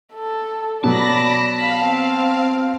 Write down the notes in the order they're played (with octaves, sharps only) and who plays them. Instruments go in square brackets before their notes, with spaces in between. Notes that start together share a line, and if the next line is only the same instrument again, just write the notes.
[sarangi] A4
[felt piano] B2 F#3 [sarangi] D5 [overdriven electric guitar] A5 [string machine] B5 A#6
[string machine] F5 [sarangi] B5
[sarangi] C4